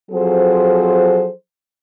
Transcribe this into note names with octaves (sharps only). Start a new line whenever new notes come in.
F3 F#3 C4 G#4 A4 C5